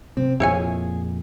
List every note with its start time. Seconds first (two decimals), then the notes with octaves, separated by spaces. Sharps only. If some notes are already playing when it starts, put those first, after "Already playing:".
0.17 C3 C4
0.40 F2 A#2 F3 E4 G#4 C#5 G#5